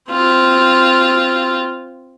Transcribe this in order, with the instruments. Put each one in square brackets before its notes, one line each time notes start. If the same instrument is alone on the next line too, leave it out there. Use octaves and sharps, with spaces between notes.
[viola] C4 F4